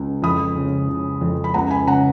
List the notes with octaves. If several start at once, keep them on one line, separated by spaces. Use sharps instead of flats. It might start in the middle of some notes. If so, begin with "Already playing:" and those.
Already playing: C#2
F2 B5 D#6
C#3
C#3
F2
B5
C#2 F#5 A#5
G#5 B5
C#3 F#5 A#5